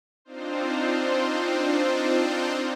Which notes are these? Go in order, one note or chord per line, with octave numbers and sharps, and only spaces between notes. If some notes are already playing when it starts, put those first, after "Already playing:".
C4 D4 D#4 F4 C5